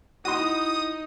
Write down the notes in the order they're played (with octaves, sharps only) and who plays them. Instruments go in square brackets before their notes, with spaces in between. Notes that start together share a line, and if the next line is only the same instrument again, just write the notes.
[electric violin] D#4 [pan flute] E4 [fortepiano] F#4 C6 [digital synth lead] D#6